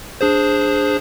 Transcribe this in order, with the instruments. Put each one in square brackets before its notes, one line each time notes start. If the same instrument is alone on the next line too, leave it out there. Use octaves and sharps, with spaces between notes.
[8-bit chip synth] D4 G#4 C5